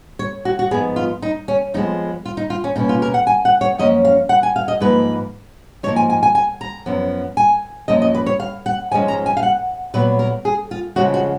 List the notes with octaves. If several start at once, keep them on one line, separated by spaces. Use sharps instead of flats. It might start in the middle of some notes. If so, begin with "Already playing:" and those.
C#5
F#4
F#4
G#2 F3 B3 G#4
F4
D#4
C#4
F2 F3 G#3 B3 D#4
F4
D#4
F4
C#4
B2 A#3 C#4 D#4
F4
A#4
F#5
G#5
F#5
C#5
F#2 F3 A#3 C#4 D#5
F5
F#5
G#5
F5
D#5
G#2 F3 A#3 B4
G#2 F3 A#3 C#5
G#5
G#5
G#5
G#5
A#5
F#2 F3 B3
G#5
F#2 F3 A#3 D#5
D#5
B4
C#5
F5
F#5
G#2 F3 G#3 C#4 G#5
A#5
G#5
F5
F#5
A#2 F#3 B3 B4
A#4
G#4
F4
F2 C#3 F3 G#3 F#4
F#4